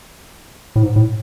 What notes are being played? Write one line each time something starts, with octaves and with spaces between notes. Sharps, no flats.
A2
G#2
A2